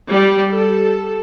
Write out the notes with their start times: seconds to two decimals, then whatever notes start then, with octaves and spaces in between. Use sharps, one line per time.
0.11 G3
0.52 A4